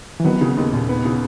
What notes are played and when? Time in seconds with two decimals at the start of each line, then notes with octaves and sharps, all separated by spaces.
0.20 E3
0.25 D#3 F#3 B3
0.41 C#3
0.57 D#2
0.73 D#2 A#2
0.89 B3
1.05 C#3